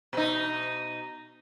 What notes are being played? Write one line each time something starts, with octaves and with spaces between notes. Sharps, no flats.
B2 D#4